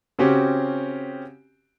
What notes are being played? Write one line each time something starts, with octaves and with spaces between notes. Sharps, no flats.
C#3 C4 C#4 F#4 G4